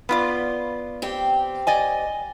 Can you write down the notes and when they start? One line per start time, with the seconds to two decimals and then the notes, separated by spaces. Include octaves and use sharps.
0.09 B3 F4 D5
1.02 C4 G4
1.67 D5 D#5 G#5